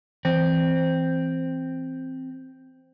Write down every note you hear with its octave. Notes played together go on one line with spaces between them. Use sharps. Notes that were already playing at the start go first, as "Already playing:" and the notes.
E3 C4